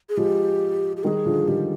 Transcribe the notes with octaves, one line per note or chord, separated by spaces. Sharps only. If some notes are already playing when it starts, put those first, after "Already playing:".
G#4
F3 G#3 G4
G4
D#3 G3 G#4 A#4
D3 F3
G#3
D#3 G3 G4